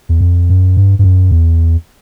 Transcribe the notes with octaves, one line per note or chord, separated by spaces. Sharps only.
E2
F2
F#2
G2
G2
F#2
E2